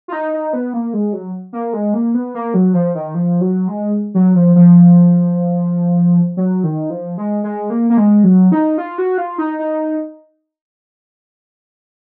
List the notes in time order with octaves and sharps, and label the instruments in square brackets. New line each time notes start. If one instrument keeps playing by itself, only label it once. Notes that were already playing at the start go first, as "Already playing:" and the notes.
[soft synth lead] F4
D#4
D#4
B3
A#3
G#3
F#3
A#3
G#3
A#3
B3
A#3
F#3
F3
D#3
F3
F#3
G#3
F#3
F3
F3
F#3
D#3
F3
G#3
G#3
A#3
A#3
G#3
F#3
D#4
F4
F#4
F4
D#4
D#4